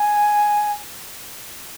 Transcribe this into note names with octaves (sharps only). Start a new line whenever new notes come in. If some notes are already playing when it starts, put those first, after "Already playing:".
Already playing: G#5